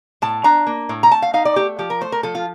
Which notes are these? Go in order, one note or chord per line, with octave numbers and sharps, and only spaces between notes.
A2 A5
D4 A#5
A#3
A2
A#5
A3 A5
F5
D#4 F5
D5
A3 G4
F3 G4
A#4
A3 C5
A#4
F3 A4
F4